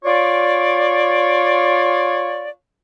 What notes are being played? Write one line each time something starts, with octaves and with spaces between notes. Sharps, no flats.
F4 C#5 D5